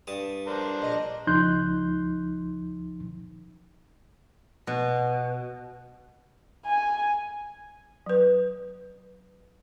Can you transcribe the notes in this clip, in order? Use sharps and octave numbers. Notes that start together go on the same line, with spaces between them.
G2 A5 D#6
D4 A#4 C5
A#1 D#5
C#2 F3 D#4 C6 F#6 G6
B2
G#5
F#3 B4